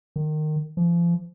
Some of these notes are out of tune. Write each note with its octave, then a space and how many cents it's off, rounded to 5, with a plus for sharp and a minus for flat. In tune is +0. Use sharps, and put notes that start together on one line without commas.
D#3 -20
F3 -35